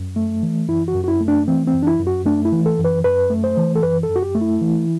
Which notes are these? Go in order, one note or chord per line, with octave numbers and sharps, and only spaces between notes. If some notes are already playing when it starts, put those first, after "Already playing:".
Already playing: F#2
A3
E3
F#2 E4
F#4
F#2
F#4
E4
A3
D4
E3 C4
C4
F#2
D4
E4
F#2
F#4
A3 D4
E4
E3
A4
F#2
B4
F#2 B4
A3
C5
E3
A4
F#2 B4
A4
F#2
F#4
G4
A3
E4
E3